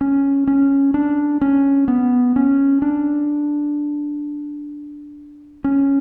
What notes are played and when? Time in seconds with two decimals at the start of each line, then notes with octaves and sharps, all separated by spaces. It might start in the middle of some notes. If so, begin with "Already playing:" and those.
0.01 C#4
0.47 C#4
0.94 D4
1.41 C#4
1.88 B3
2.36 C#4
2.82 D4
5.64 C#4